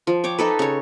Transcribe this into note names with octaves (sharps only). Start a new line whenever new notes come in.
F3
C#5 G5 D6
D#4 A4 B4
C#3 C#5